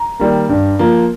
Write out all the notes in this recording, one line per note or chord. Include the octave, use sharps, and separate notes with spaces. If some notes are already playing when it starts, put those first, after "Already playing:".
Already playing: A#5
D#3 G3 A#3
G2
F3 A#3